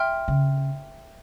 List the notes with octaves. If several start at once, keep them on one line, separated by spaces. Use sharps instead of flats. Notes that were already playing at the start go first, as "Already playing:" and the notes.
Already playing: E5 G5 C6 F6
C#3